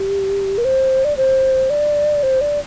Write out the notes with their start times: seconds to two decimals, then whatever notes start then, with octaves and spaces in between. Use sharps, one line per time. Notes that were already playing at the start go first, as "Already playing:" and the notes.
Already playing: G4
0.58 A#4
0.65 C5
1.05 D5
1.17 C5
1.70 D5
2.23 C5
2.41 D5